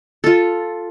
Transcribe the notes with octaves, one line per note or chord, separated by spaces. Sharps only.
F4 A4